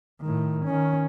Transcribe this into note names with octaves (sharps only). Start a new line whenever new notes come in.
A2 D#3
D#3 C#4